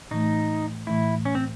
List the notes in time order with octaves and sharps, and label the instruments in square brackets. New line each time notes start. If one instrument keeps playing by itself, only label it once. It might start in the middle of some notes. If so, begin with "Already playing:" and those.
[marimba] A2 E3 A3 [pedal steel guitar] D#4
[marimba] A2 E3 A3 [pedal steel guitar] E4
[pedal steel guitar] C#4
C4